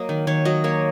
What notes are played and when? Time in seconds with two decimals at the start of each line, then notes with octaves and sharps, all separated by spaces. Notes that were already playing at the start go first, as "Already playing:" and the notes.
Already playing: F#3 A#3 D#5
0.09 D#3
0.27 D#3 C#5
0.45 F#3 D#5
0.64 A#3 C#5